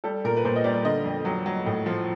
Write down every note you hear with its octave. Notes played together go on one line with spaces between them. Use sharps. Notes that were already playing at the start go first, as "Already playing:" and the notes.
G3 A4
A#2 A#4
B4
A#2 C5
D#5
G3 D5
D3 D#5
F2
F#3
F#3
A2
F3